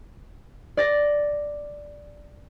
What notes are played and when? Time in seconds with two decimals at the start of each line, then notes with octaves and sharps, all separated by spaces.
0.77 D5 A6 A#6